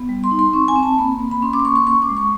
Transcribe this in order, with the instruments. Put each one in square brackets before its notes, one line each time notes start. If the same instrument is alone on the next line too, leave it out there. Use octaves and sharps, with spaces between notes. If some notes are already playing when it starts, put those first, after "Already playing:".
Already playing: [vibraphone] B3
G3
C6
D#4
C6
C4 C#6
G#5
C4
A5
A#3 B5
A#3
B5
C#4 C6
D6
C6
A#3 C#6
C#6
C#4 C#6
D6
G#3
C#6